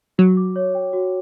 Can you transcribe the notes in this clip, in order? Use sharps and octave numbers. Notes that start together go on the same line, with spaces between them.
F#3 F#4
D6
C#5
G5
F#4